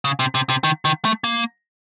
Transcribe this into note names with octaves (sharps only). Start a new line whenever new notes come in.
C#3
C3
C3
C3
D#3
D#3
A3
A#3